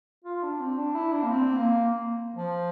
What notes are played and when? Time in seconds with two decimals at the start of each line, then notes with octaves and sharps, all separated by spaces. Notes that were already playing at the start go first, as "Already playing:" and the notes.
0.24 F4
0.43 D4
0.60 C4
0.78 D4
0.95 E4
1.12 D4
1.23 A#3
1.30 C4
1.57 A#3
2.36 F3